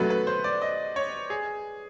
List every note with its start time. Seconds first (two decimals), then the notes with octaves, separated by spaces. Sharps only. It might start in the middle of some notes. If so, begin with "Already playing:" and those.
Already playing: B2 F#3 A3 B4
0.10 B4
0.27 C5
0.44 D5
0.62 D#5
0.96 C#5
1.30 G#4